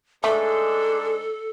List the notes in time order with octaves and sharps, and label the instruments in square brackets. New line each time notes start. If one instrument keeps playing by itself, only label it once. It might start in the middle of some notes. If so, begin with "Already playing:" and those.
[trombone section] G#2 D4 [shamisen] A3 [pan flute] A4